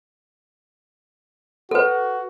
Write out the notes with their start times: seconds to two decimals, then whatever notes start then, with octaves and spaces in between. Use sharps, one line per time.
1.71 F#4 A4 B4